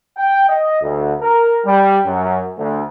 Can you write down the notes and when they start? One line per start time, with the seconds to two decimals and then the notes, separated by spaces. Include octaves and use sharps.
0.17 G5
0.49 D#5
0.81 D2
1.20 A#4
1.65 G3
2.05 F#2
2.58 D2